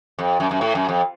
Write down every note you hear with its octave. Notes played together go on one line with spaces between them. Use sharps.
F2
F#2
F#2
A2
F#2
F2